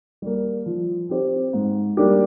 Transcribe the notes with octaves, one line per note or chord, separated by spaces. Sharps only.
G3 A#3
F3
C4 G4 C5
G#2
G3 A#3 D4 G4